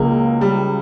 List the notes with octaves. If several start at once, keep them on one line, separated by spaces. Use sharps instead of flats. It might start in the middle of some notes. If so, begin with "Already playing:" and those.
Already playing: C#2 C#3 F#3 A#3
G3